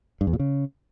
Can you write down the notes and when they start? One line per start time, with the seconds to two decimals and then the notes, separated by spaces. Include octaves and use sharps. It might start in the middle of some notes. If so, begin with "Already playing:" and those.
0.21 G2
0.27 E2
0.33 A#2
0.39 C#3